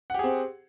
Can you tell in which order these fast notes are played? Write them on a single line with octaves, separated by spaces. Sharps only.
F#5 G4 G#4 C4